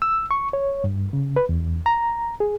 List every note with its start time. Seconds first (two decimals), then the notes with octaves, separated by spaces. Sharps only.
0.02 E6
0.31 C#6
0.53 C#5
0.84 G2
1.13 C#3
1.36 B4
1.49 E2
1.86 A#5
2.40 G#4